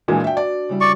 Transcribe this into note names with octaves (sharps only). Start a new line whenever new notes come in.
A#2 E3 G#3 D4 F#4 B4
E5 G5
D5
C#3 G3 E4
D5 C#6